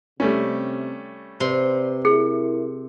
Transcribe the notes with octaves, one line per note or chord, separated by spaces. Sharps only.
C3 G3 A3 C#4
C3 B4 D5 C6
E4 G#4 A#4